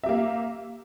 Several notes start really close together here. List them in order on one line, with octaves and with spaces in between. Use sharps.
E5 G4 A#3